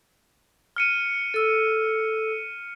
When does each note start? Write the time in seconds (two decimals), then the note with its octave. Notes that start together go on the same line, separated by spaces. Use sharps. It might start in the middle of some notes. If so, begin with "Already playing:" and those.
0.76 F6 C#7 D#7
1.34 A4 E6